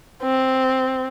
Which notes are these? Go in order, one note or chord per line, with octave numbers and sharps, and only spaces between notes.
C4